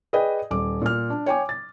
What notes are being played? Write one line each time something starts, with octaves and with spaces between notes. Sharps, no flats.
G#4 B4 D5 D#5 G5
D#1 D6
A#2 F6
D4
C#5 G5 G#5 D6
A6